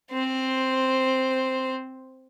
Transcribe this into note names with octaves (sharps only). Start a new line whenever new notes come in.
C4 C5